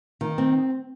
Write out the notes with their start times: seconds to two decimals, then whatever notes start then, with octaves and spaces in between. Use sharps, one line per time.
0.21 D#3
0.38 C4